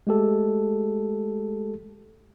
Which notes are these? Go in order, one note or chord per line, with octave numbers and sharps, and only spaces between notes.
G#3 A3 G4 A4